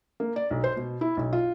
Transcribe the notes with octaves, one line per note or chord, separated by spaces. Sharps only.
A#3
D5
B1
C5
B2
E4
B1
F4